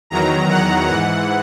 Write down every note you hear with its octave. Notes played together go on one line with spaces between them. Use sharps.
E2 D#3 F#3 A#5
F#5
G#2 E3 F#5